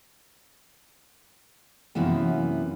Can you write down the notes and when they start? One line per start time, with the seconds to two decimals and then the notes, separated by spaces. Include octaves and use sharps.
1.95 F#2 C3 E3 A#3 B3